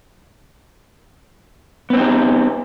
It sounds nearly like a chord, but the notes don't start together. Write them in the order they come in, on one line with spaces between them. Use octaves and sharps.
B3 C4 D#4 G4